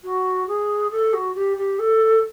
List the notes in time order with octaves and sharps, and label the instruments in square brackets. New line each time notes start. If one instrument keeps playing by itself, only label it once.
[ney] F#4
G#4
A4
F#4
G4
G4
A4